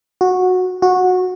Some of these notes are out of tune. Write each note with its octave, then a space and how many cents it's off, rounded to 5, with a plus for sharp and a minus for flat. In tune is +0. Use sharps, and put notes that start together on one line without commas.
F#4 -15
F#4 -15